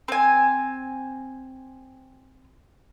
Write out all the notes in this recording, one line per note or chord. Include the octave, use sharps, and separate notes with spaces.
C4 G#5